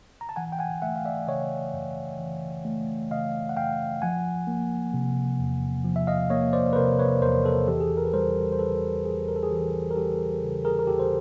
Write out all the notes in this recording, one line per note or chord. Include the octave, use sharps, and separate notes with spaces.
A#5
A5
E3 F#5 G#5
G5
F#5 G#5
A3 E5 F#5
F5
D5 E5
C#3 C#5 D#5
F#2
E3
A3
C#3 D#5 F5
F#5
F#2 F5 G5
F3 F#5 G#5
A#3
C3
E2
F3
E5
D#5 F5
A#3 C#5 D#5
C5 D5
B4
C3 A#4 C5
B4 C#5
E2 A#4 C5
A4 B4
E3 G4 A4
G#4
A4
A#4
B4
G3 A#4 C5
C5
C#3 A4 B4
E2 G#4
A#4
A4
G#4
E3 G4
A#4
G3 G4 A4
C#3
G#4 A#4
A#4
E2 G4 A4
C5